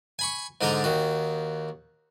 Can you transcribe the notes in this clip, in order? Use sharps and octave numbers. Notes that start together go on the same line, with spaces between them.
G#5 B5 C#6
G#2 D3 D4 D#4 D#5 A#5
D#2 D#3 F#4